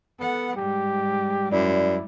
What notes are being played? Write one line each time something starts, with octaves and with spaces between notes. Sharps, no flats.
B3 A4 F#5
G#2 G3 G4
F#2 E4 D5